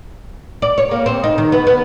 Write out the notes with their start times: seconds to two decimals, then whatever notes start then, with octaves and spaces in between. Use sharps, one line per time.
0.62 D5
0.78 C#5
0.91 A#3
1.06 C4
1.24 D#4
1.38 D#3
1.52 B3
1.67 B3